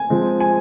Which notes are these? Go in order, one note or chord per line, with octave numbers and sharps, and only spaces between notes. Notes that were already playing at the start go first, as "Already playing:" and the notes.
Already playing: G#5
F3 G#3 C4
G#5